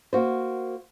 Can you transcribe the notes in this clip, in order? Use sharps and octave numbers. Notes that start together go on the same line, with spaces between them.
A#3 F#4 C5